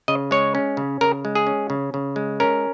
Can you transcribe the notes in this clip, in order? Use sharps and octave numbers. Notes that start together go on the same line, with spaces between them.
C#3 D#5
G#3 C#5
C#4
C#3
C#3 A#4
G#3
G#4
C#4
C#3
C#3
G#3
C#4 A#4